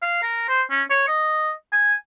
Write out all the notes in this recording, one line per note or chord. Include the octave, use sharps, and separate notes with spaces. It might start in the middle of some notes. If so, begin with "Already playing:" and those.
F5
A#4
C5
C#4
C#5
D#5
G#5